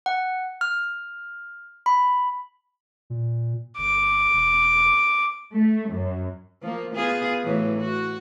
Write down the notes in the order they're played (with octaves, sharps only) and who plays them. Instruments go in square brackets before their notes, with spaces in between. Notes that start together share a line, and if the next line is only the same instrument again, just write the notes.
[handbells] F#5
F6
B5
[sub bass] A#2
[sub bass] G1 [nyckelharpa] D6
[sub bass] E1
[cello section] A3
F#2
[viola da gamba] F3 A#3
B3 F4 G#4
A2 E3 F#3
F#4